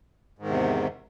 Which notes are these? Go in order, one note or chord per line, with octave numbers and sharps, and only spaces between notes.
E2 G#2 C3 D#3